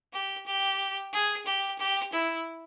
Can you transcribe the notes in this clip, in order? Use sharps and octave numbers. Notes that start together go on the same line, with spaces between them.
G4
G4
G#4
G4
G4
E4